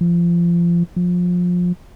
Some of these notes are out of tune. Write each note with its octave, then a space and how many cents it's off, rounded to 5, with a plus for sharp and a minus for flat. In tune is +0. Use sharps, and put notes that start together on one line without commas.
F3 -25
F3 +25